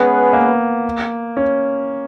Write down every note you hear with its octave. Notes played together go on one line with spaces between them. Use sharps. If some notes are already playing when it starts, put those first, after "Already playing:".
Already playing: G#3 B3 C#4 G#4 B4 F#5
A#3
C#4